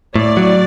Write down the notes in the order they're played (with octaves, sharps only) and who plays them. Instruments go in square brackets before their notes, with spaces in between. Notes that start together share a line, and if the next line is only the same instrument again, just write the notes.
[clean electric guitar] A2 [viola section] D5
[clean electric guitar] F#3